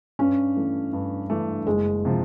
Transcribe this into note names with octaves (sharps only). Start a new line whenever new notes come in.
G2 C#4
E3 A3
G2
E3 A3
F#1 G#3
C3 F3